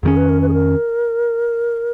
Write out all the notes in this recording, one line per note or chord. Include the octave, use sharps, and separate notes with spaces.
F2 D#3 A#3 C#4 G#4
B4
A#4
B4
G#4
A#4